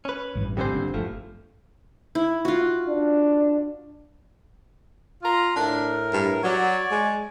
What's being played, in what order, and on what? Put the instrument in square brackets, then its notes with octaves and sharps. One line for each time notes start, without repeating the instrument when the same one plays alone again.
[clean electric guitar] C#4 B4
[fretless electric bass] A1 G2 E3
[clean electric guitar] C#2 D3 C5 [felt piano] G3 C4 G#5
[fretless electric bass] F#1 A2 D4
[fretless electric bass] G1 [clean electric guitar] E2 F3 [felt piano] A3
[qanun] E4
F4 F#4
[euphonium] D4
[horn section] F4 A#5 C6
[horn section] A2 A#4 [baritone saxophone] D4
[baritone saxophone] G2
[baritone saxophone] F#3 [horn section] C#5 D5
[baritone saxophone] G#3